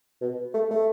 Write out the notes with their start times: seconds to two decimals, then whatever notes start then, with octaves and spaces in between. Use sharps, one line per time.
0.22 B2
0.54 A3
0.71 A3